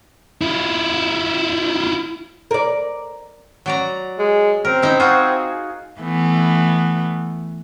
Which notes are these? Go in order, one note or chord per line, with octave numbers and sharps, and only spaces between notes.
E4 F4
A#4 D5
F#3 D5 A#5
G#3
C4 A#4
D#4 E4
F4 F#4 G#4
E3 A3 B3